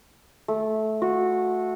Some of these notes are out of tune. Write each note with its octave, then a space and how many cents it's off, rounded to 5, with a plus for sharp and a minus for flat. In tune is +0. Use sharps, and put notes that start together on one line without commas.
A3 -15
F#4 -15